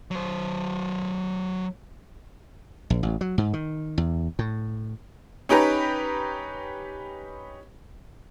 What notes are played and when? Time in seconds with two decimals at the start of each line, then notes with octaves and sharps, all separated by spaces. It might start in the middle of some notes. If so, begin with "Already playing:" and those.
0.11 F#3 C5
2.90 A#1
3.03 A1
3.21 F#3
3.38 G#2
3.53 D#3
3.98 E2
4.39 A2
5.49 C#4 D#4 G4 B4 A#5